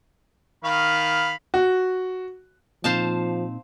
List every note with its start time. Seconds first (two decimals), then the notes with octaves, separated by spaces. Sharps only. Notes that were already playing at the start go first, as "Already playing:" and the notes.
0.64 D#3 F5 B5
1.54 F#4
2.84 A#2 F3 C4 D#4 C5 F5 A5